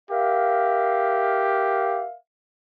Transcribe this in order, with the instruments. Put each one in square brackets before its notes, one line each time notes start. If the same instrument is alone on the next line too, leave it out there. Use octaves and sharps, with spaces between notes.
[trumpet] G4 [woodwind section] A#4 E5 F5